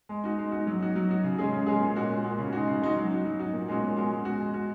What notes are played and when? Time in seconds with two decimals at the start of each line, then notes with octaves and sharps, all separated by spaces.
0.09 G#3
0.24 D#4 F#4
0.38 G#3
0.52 D#4 F#4
0.67 F#3
0.80 D#4 F#4
0.96 F#3
1.09 D#4 F#4
1.24 C#3
1.38 G#3 C#4 G#4
1.52 C#3
1.66 G#3 C#4 G#4
1.81 A#2
1.95 G#3 C#4 F#4
2.10 A#2
2.24 G#3 C#4 F#4
2.38 C#3
2.53 G#3 D#4 F#4
2.67 C#3
2.82 G#3 D#4 F#4
2.97 F#3
3.11 D#4 F#4
3.25 F#3
3.39 D#4 F#4
3.53 A#2
3.69 G#3 C#4 F#4
3.83 A#2
3.96 G#3 C#4 F#4
4.11 G#3
4.25 F#4
4.40 G#3
4.54 F#4